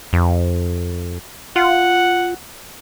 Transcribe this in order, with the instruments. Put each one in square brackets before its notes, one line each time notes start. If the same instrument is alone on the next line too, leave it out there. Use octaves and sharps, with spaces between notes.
[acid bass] F2
[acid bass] F4 [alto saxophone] F#5